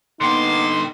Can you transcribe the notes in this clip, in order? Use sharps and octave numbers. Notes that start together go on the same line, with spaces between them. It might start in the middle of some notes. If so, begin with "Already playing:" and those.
D3 A#3 B3 D#4 G5 C6 D6